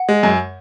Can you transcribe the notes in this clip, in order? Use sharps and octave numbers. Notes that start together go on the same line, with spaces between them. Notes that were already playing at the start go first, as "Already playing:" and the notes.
Already playing: F#5
G#3
F#2